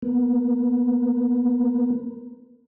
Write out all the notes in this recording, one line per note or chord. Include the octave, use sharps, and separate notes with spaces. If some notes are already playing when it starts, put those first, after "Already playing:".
A#3 B3